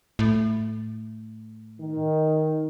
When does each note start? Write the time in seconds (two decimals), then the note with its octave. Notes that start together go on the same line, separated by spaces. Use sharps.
0.19 A2
1.81 D#3